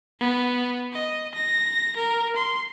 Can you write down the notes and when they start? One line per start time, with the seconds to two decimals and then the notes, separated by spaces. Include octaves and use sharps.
0.20 B3
0.93 D#5
1.34 A#6
1.96 A#4
2.36 C6